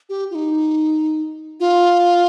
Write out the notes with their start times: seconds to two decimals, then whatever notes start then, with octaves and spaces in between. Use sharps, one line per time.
0.09 G4
0.31 F4
0.35 D#4
1.60 F4